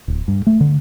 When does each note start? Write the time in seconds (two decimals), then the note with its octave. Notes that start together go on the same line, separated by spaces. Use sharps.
0.08 D1
0.28 G2
0.47 A3
0.61 D3